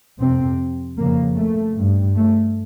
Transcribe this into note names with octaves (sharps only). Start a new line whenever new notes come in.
F2 C3 C4
F2 C#3 A#3
A3
G2
A3